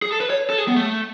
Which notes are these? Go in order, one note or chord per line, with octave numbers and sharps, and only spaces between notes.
G#4
A4
B4
C#5
A4
G#4
B3
A3